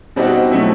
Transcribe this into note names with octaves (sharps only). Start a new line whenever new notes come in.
B2 G3 C4 D#4 F#4
B2 F#3 A3 C4 E4